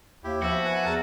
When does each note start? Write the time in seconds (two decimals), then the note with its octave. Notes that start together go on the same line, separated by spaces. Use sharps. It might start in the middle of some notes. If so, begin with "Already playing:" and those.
0.24 D#2 E4 G4
0.42 F3 B3 F#4 E5
0.65 B4 F#5 G#5
0.86 E2 A#4 A5